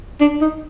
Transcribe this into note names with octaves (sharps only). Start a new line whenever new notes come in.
D4
D#4